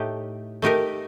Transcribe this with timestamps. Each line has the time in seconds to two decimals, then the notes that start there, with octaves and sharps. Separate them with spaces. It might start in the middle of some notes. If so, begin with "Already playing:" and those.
Already playing: A2 A3 D#4 G4
0.62 A3 D#4 G4 A#4